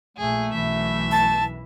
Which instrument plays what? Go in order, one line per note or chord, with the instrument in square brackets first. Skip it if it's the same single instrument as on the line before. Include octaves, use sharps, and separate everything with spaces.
[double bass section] A#1 [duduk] A3 [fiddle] G#4
[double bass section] B1 F#2 E3 [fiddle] E5
[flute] A5